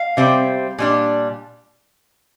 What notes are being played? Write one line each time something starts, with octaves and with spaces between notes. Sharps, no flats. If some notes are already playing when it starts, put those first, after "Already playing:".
Already playing: F5
C3 G3 C4
A#2 G3 D4